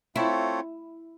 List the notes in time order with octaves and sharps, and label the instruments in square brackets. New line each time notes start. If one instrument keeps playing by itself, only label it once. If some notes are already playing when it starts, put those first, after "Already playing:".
[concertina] A3 C4 F4 A4 C#5 [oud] E4